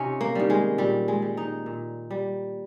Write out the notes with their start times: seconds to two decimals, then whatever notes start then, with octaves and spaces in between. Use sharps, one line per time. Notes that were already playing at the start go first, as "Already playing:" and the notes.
Already playing: C3 C#4 D#4 F4
0.21 A#3
0.35 D#3 G3
0.50 G#3
0.78 A#2 G3
1.08 G#3
1.22 G3
1.37 D#4
1.66 A#2
2.11 G3